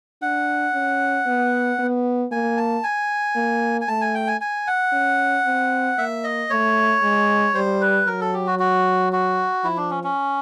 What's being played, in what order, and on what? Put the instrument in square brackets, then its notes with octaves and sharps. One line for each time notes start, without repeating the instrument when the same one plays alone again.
[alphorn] D4 [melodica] F#5
[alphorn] C#4
B3
B3
[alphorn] A#3 [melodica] G#5
[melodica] A5
G#5
[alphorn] A#3
[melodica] G#5
[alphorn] A3 [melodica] A5
[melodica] G#5
G5
G#5
G#5
F#5
[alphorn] C#4
C4
[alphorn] A#3 [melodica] E5
[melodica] D#5
[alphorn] A3 [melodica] C#5
[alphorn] G#3
[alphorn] G3 [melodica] C5
[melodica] B4
[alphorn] F#3 [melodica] A#4
[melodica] A4
G4
F#4
F#4
F#4
[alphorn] F3 [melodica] E4
[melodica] D4
C#4
C#4